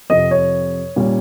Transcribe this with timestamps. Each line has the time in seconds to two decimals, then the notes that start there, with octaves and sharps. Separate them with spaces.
0.10 F2 C3 F3 D#5
0.31 C#5
0.96 A#2 G3 C#4